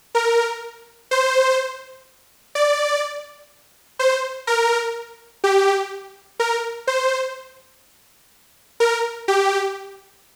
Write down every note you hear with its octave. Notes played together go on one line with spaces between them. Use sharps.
A#4
C5
D5
C5
A#4
G4
A#4
C5
A#4
G4